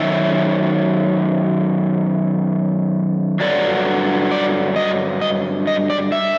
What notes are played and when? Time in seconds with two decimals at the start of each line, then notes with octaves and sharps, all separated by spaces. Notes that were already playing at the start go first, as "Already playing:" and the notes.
Already playing: F#2 D#3 E5
3.40 G2 D3 F#3 D5
4.31 D5
4.76 D#5
5.21 D#5
5.67 D#5
5.90 D5
6.12 E5